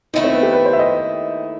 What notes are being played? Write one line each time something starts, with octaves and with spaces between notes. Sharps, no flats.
D#2 D#3 A3 D#4 E4
C4
B3
G4
B4
C5
E5
D#5